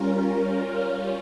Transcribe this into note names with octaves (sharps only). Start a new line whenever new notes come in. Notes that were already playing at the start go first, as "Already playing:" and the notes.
Already playing: G3 C#4 F4 A#4
G3 C#4 F4